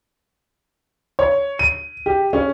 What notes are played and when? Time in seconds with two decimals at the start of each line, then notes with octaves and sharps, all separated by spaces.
1.19 C#5
1.59 D#7
2.06 G4
2.33 C#4